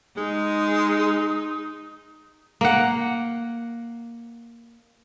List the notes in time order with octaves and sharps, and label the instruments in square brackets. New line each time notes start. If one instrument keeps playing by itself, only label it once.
[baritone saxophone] G#3 [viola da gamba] D#4 [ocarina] D#6
[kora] A#3 F#5